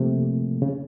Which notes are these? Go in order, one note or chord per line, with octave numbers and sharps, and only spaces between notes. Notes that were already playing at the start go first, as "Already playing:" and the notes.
Already playing: C3 F3 A3 A#3
C#3